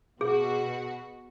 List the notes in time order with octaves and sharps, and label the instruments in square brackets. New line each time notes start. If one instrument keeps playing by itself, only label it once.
[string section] B2 F#4 [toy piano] G#4